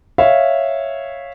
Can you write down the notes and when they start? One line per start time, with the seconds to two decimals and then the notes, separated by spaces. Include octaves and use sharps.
0.18 C#5 E5 F5